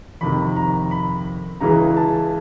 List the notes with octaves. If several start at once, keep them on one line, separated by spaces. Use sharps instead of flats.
F2 C3 D#3 B5
A#5
B5
C#2 C#3 E3 G#3 A#5
A5